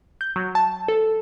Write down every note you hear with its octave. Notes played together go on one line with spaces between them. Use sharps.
G6
F#3
A5
A4